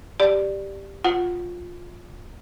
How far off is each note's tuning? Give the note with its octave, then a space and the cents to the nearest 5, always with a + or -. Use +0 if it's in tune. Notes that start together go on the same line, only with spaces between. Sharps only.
G4 +0 D5 +10
F4 +10 F#5 +10